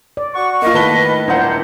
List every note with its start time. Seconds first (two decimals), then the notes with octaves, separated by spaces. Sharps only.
0.17 D5
0.34 F#4 F#5 C#6
0.62 A#3 F4 D#5
0.74 A2 D#3 B4 A5 G7
1.28 D#1 D4 E4 C5 F#5 A#5